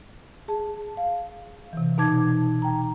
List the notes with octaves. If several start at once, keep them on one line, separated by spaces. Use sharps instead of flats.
G#4 A5
F5
C3 E3
B2 D#4 A5 D6 G#6
G5 A#5